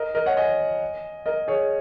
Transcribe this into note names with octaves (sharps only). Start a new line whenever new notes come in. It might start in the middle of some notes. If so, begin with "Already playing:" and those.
Already playing: A#4 D#5
A#4 D#5
C#5 F#5
D#5 G#5
A#4 D#5
G#4 C#5